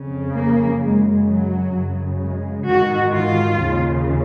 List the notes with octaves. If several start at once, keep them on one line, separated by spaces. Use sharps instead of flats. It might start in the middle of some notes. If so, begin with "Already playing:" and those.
Already playing: F2 C#3
A#3
F#2 C#3 G#3
F#3
F#2 C#3
G#3
G#2 D#3 F#4
F4
D#2 C#3